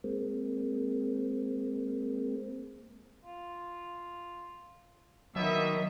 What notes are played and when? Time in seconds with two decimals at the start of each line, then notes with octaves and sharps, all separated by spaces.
0.04 G#3 A#3 C4
3.25 F4
5.36 B2 D#3 F#3 A#3 D#5 E5